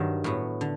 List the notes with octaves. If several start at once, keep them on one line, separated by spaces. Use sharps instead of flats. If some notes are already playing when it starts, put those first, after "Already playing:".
Already playing: G2 D#3 F#3
A2 F#3 B3
D3